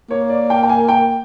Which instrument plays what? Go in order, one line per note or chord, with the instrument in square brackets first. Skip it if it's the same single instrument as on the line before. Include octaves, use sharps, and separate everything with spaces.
[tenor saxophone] A#3 [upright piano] C#5
[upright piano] D5
G5
G5
G#5
G5